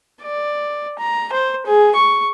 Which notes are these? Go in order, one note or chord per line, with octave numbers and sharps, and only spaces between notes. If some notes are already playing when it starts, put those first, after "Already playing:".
D5
A#5
C5
G#4
C#6